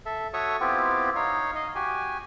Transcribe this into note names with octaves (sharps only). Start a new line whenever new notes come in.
A4 E5
F#4 A4 C#5 E5 C#6 D#6
B3 C4 E4 F4 G4
D#4 C#5 F5
D#5 F5
F#4 G4 G#5